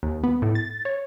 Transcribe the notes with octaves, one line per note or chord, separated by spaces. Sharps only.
D#2
B3
A2
A6
C#5